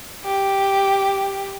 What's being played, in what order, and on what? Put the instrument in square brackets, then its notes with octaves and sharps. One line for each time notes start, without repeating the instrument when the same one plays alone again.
[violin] G4